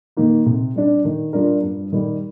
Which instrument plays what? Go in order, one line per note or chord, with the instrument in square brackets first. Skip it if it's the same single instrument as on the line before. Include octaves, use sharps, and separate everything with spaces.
[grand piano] D#3 A#3 D#4
C3
G3 D4
D#3
G3 D4 F4 A#4
G2
D#3 G3